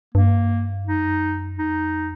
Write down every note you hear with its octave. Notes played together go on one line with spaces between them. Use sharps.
G2 A#3
F#2 D#4
F2 D#4